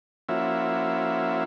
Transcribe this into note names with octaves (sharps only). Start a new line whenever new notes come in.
F3 A#3 C#4 E4 F#4 E5